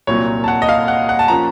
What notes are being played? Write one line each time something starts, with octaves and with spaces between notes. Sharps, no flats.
C2 A#2 F#3 C#5
A5
F#5
D#5
F5
F#5
F#5
A5
F3 A#3 C#4 A#5